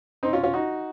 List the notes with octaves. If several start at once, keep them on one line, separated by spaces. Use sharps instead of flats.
C4 D#4
C#4 F4
C#4 F4
D#4 F#4